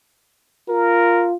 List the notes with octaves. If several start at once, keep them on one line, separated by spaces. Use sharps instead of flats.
F4 A#4